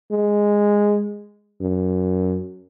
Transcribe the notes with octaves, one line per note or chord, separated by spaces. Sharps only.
G#3
F#2